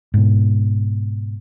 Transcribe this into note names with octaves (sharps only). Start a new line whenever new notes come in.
G#2 B2